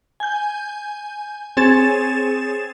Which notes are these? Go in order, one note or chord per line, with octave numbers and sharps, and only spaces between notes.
G#5 G6
C4 G#4 C#5 A6 E7